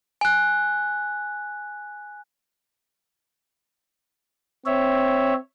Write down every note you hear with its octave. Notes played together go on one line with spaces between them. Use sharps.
G#5 F#6
C4 C#5 E5